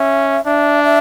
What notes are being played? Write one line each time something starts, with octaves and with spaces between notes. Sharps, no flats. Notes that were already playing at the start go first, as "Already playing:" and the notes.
Already playing: C#4 E5
D4 E5
E5